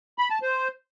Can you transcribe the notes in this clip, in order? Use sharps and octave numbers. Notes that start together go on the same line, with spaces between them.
B5
A5
C5